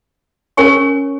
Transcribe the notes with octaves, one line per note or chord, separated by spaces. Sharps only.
C#4 A#4 C#5 G#5 C#6